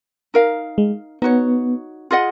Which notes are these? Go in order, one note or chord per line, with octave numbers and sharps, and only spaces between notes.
D#4 A#4 F5
G#3
B3 D#4 F#4 C#5
F4 G#4 D#5 F#5